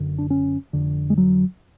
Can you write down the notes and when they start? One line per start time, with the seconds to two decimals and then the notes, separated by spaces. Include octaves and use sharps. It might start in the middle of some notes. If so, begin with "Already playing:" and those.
Already playing: F#1 F#2 D3
0.18 D4
0.30 C#4
0.73 F1 F2 D3
1.10 G#3
1.18 F#3